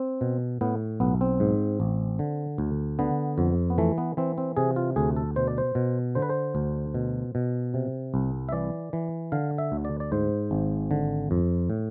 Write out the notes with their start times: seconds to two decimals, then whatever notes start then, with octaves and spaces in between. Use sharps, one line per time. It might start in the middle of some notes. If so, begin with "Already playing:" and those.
Already playing: C4
0.21 B2
0.61 A2 B3
1.00 B1 B3
1.21 C4
1.40 G#2
1.80 A1
2.19 D3
2.58 D2
2.99 D3 B3
3.38 F2
3.70 B3
3.78 E3 A3
3.98 B3
4.17 E3 C4
4.38 C4
4.57 C3 G#4
4.76 F4
4.96 D2 G#4
5.16 A4
5.36 B2 C5
5.48 D5
5.58 C5
5.75 B2
6.15 D3 C5
6.22 B4
6.29 C5
6.55 D2
6.94 B2
7.35 B2
7.74 C3
8.14 C2
8.49 E5
8.52 E3 D5
8.93 E3
9.32 D3 F5
9.58 E5
9.72 D2
9.85 D5
10.00 D5
10.12 G#2 C5
10.51 G#1
10.91 D3
11.31 F2
11.70 A2